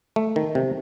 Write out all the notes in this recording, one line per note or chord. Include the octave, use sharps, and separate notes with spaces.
A3
D#3
C3